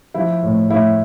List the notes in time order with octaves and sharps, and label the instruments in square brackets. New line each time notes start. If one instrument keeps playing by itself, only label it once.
[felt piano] F3 E4
A2
A2 E4